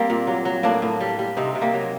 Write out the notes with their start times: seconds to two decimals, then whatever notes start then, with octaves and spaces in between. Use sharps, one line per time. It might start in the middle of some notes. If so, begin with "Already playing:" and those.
Already playing: G3 A#3 C4
0.10 A#2
0.27 F#3
0.45 F#3
0.63 A2 A#3 D4
0.82 A2
1.01 G3
1.19 G3
1.37 C3 C4 D#4
1.55 C3
1.61 G3 A#3
1.74 F#3